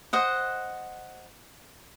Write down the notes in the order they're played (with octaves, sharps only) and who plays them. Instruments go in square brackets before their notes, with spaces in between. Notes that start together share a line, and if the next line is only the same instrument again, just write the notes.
[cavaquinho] C5 D#5 F#5